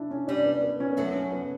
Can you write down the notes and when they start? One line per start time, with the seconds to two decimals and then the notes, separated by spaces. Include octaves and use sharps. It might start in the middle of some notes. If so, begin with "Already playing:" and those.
Already playing: D4 E4
0.11 C#4
0.28 G2 G3 D4
0.45 B3
0.62 B3
0.80 C#4
0.90 B3
0.97 F#2 F#3 A3
1.15 C#4
1.32 B3